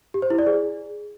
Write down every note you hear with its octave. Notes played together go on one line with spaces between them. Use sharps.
G4
C5
E4
D5
G#4